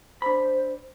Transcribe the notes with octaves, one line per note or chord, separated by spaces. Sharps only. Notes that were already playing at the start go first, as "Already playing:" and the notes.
D4 C5 B5